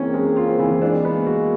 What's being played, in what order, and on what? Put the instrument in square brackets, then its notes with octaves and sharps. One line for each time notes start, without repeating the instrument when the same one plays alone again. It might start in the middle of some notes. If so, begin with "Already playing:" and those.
Already playing: [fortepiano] E3 G#3 C#4 [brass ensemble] A#3 C4
[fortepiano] G#3
F4
E3
[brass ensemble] G#3 A#3 [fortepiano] D4
[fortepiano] B3
F#4